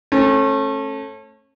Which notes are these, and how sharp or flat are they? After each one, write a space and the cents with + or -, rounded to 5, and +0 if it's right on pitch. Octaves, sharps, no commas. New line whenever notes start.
A3 +0 C#4 -35